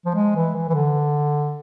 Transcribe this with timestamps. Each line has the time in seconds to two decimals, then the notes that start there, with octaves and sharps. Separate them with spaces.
0.06 F3
0.15 G#3
0.35 E3
0.56 E3
0.69 E3
0.74 D3